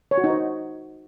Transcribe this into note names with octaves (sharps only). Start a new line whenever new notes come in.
C#5
F#4
D#4
C5